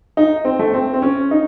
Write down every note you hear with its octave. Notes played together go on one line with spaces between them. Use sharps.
D#4
C4
A3
C4
C4
C#4
D#4